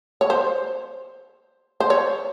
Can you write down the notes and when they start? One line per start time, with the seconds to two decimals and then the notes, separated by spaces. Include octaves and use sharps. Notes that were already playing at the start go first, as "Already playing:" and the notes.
0.21 C#5
0.30 C5
1.80 C5
1.90 C#5